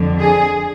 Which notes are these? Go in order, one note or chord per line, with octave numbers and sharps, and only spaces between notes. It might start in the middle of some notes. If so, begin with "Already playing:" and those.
Already playing: F2 D3
G#4